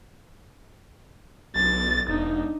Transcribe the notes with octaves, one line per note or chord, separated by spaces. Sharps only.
B1 A6
E1 D4 D#4